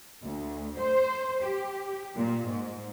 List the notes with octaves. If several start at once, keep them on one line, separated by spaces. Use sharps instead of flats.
D2
C5
G4
A#2
G#2